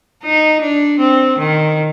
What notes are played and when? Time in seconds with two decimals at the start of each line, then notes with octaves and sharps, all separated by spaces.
0.24 D#4
0.61 D4
1.00 C4
1.38 D#3